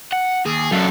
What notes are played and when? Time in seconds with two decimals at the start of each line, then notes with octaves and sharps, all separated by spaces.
0.12 F#5
0.46 D#2 G#4
0.72 F#2 D4 F4 A4